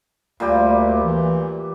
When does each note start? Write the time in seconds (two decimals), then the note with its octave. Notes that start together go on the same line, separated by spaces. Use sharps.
0.40 D2 A#2 G3 G4
1.05 E3